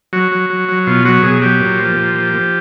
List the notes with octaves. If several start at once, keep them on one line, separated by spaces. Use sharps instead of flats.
F#3 F#4
F#3
F#3
F#3
B2 F4
F#3 F#4
B2 G#4
F#3 G4
A#2
F3
A#2
F3
F3